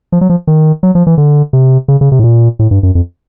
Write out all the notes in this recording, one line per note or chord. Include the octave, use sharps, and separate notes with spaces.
F3
F#3
F3
D#3
F#3
F3
E3
D3
C3
C#3
C#3
C3
A2
A#2
A2
G2
F#2
F2